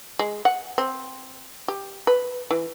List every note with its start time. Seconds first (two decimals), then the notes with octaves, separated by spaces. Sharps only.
0.19 G#3
0.45 F#5
0.78 C4
1.68 G4
2.07 B4
2.51 E3